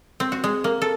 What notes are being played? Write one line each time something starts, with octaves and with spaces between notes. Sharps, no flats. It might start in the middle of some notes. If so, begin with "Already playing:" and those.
C4
F#4
G#3
A#3
A4